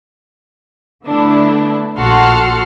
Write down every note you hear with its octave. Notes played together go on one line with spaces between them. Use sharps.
D3 A3 B3 D4 E4
A#1 F#4 A4 F#5 C6 F6